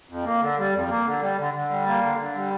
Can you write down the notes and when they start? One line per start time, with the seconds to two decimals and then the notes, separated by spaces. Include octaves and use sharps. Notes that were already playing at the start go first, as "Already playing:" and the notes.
0.09 F2
0.25 A#3
0.40 D3
0.58 G3
0.74 F2
0.90 A#3
1.05 D3
1.21 G3
1.38 D3
1.54 D3
1.69 G3
1.86 A#3
2.03 D3
2.19 D3
2.34 G3